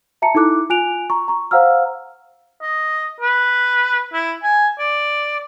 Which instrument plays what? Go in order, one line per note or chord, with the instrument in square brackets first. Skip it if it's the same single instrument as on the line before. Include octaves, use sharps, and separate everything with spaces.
[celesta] E5 A5 A#5 C#7
D#4 E4 A4 D6 F#6
F4 G#5 F#6 D7 F7
A#5 C#6
A#5 C#6
C5 F5 F#5 A#5 E6 F6
[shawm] D#5
B4
E4
G#5
D5